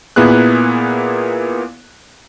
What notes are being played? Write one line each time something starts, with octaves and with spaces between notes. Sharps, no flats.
A#2 A#3 B3 E4 G#4 F#6